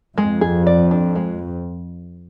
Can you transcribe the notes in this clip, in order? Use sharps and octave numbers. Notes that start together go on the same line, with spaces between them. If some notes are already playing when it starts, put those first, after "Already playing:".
F2 G#3
G#4
D5
D4
G#3